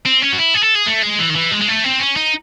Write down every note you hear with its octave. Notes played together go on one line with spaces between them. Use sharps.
C4
C#4
F#4
E4
G#4
A4
G#4
A3
G#3
E3
D#3
E3
G#3
G#3
A3
C4
C#4
D#4